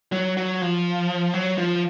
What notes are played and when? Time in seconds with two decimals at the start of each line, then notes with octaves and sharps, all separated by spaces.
0.12 F#3
0.37 F#3
0.62 F3
1.34 F#3
1.58 F3